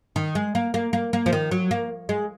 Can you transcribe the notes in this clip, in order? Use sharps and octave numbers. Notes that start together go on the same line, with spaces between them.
D#3
G#3
A#3
A#3
A#3
A#3
F3
D#3
F#3
A#3
G#3